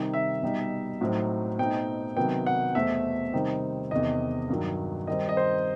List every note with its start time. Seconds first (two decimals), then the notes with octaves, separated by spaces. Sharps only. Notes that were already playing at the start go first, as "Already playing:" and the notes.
Already playing: C3 D#3 G3 D#4
0.14 E5
0.42 B2 G3 D#4
1.01 A2 F#3 C4 D#4
1.58 B2 A3 C4 D#4 G5
2.16 C3 D#3 F#3 B3 G5
2.46 F#5
2.75 E2 B2 A3 C4 E5
3.33 C3 D#3 G3 C4 D#4
3.91 E2 C3 D#3 D#5
4.49 G2 D#3 F#3
5.07 D#3 G3 C4 D#4 D#5
5.29 D#5
5.37 C5